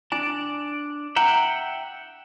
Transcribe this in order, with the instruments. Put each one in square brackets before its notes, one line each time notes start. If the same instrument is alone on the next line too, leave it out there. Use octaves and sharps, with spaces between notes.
[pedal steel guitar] D4 D5 [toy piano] G#5
[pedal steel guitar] E5 F#5 G5 [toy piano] A#5